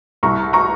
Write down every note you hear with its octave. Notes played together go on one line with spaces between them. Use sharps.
C2 A#5 C#6
A#5 C#6